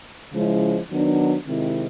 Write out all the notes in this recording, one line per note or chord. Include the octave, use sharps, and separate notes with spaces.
C#3 F3 G#3 C#4 E4
D#3 F#3 B3 D4
C3 D#3 G#3 C4 E4